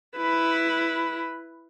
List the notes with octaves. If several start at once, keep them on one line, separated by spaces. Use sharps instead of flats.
E4 B4